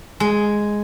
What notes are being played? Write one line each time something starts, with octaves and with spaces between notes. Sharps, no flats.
G#3